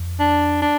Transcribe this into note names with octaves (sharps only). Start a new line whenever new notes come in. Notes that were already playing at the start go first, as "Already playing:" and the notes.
Already playing: F2
D4
D4